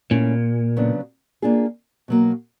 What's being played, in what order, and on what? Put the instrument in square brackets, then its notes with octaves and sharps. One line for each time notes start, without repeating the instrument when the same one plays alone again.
[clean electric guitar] A#2 [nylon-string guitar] A3 C#4 E4
[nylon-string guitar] C#3 F#3 B3 D4
A#3 D4 F4 G#4
B2 F#3 A#3